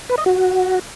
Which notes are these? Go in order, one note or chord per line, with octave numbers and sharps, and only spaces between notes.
B4
D#5
F#4